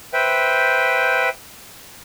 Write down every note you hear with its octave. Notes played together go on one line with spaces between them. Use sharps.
B4 C5 E5 G5